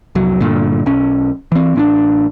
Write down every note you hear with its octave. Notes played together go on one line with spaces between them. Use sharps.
F1 C2 F#3
G2 A#2 D3
B1 C#4
E3 C4
A1 C#4 D4